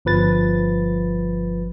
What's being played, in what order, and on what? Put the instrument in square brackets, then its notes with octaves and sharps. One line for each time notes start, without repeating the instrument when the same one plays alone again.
[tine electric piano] G1 F3 B4 A6